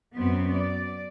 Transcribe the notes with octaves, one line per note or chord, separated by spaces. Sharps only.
F#2 B3 C4
D5